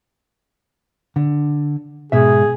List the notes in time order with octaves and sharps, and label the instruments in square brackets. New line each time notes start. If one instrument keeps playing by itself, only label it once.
[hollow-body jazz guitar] D3
[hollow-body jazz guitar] G#2 B2 E5 [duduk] G#4